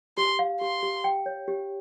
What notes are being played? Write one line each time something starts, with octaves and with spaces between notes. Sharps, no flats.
G4 C6
F5
G4 C6
G4
G5
C#5
G4